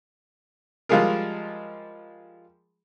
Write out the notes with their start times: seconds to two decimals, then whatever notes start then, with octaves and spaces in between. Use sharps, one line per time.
0.89 F3 G3 G#3 F4 G#4 A#4